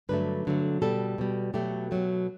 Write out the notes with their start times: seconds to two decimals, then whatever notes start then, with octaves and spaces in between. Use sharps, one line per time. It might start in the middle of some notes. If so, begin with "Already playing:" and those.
0.09 G2 D3 F#3 A3 B4
0.45 G2 D3 F#3 A3
0.82 B2 G3 A4
1.18 B2 G3
1.54 B2 F#3 A3 G4
1.91 B2 F#3 A3